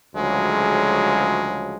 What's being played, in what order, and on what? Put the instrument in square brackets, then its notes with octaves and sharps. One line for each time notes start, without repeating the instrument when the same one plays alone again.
[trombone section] D2 C#3 F3 F#3 G#3